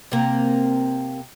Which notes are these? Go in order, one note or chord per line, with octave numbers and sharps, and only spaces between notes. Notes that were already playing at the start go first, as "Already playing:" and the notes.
C3 A#3